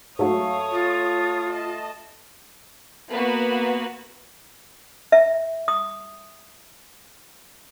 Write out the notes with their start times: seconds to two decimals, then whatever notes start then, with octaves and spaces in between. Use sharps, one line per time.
0.19 G#2 F#3 A3 C#5 F5 D#6
0.71 F4
1.51 D#5 A5
3.13 A#3 B3 F#4 B4
5.12 E5
5.68 D#6